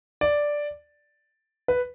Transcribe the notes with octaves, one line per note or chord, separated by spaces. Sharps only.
D5
B4